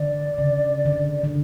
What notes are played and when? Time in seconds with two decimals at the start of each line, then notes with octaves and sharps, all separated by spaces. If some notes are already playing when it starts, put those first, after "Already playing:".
Already playing: D3 D5
0.38 C#3
0.86 D3
1.24 D3